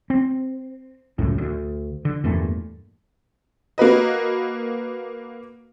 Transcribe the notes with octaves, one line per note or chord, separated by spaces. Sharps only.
C4
C#2 F#2 A2
D2
D3
E2 G2 A#2 A3
A#3 F#4 B4 D#5